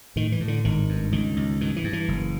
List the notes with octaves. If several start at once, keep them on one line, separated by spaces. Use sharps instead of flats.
A2 D#3
E3
A2
D3
G#1 D#3
G2
C#2 D#3
C#2
G2 D#3
E3
G2
E3
F#1